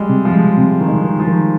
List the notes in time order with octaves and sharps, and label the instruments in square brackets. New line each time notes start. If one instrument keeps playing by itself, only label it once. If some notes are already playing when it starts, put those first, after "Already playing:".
Already playing: [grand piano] G3 G#3
[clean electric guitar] C3
[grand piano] F3
[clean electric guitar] G#3
C3
D#3
[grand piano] G#3
[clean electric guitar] D#3
[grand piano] F3
[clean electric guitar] D#3